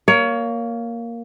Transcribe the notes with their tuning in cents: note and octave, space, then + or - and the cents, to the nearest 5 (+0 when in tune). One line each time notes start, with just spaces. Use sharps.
A#3 +0 C#5 +25